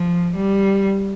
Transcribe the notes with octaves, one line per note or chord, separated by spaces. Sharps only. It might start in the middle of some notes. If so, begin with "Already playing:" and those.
Already playing: F3
G3